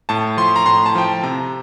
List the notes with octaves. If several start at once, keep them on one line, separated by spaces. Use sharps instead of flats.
A2 A5
F3 C6
A#5
A2 C6
A5
F3 G5
A5
C3 A#5